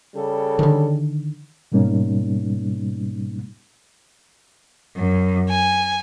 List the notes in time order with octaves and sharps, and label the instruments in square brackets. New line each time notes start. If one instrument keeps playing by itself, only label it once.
[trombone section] C#3 G3 A4
[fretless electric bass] D3 D#3
[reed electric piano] G#2 B2 G3 A#3 C#4 D#4
[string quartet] F#2
G#5